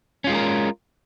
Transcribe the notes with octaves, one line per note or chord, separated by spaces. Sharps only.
G#3 C#4 F4 G4 A#4